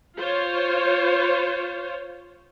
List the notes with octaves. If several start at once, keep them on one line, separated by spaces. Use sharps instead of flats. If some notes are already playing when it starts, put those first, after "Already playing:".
F4 C5 C#5